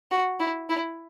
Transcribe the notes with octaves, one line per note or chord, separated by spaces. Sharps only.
F#4
E4
E4